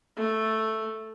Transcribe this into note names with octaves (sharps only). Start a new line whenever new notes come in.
A3